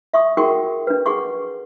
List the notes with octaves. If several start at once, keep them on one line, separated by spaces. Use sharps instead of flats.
E5 C#6 D#6
F#4 G#4 A#4 F#5 G5 C#6
D4 B4
G#4 F#5 C#6 D6